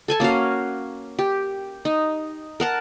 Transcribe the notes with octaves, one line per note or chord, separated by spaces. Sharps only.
A4 G#5 A5
A#3 C#4 F#4 F5
G4
D#4
A#4 F#5 A5